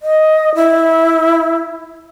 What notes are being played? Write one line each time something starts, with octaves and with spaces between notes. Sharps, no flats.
D#5
E4